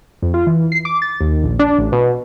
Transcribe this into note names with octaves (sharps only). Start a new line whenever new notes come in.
F2
F4
E3
C7
D6
A6
D#2
A#1
D4
A1
B2